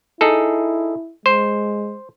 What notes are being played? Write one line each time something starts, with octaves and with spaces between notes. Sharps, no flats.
D#4 E4 G#4 A4
G#3 C5